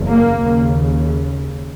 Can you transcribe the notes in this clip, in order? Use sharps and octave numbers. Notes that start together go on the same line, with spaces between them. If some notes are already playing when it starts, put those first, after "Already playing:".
Already playing: F#1 E2 C#3
A#3
D#2 C#3